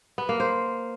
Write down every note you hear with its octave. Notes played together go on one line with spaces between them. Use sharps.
B3
A#3
C5